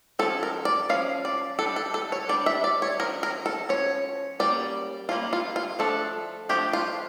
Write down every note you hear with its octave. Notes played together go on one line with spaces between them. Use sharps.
F3 C#4 A4
A#4
D5
F3 C#4 F5
D5
G3 D4 A4
A4
A4
C#5
G3 D4 D5
E5
D5
C#5
F3 C#4 A#4
A#4
A4
F3 C#4 C#5
G3 A#3 C#4 D5
G3 A#3 C#4 F4
F4
F4
F3 A3 D4 A4
F3 A3 D4 G4
F4